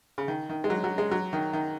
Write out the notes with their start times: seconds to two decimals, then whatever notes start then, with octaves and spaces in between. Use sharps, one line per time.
0.18 C#3
0.28 D#3
0.49 D#3
0.64 G#3
0.70 F#3
0.84 F#3
0.98 G#3
1.11 F#3
1.33 D#3
1.53 D#3